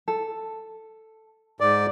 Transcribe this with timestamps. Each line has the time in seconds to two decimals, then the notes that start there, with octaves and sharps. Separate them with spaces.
0.08 A4
1.61 G#2 D5